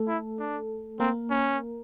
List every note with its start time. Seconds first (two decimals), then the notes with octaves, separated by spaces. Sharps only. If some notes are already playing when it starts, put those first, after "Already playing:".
Already playing: A3 A4
0.08 E4
0.39 D4
1.00 A#3 C4 A#4
1.30 C#4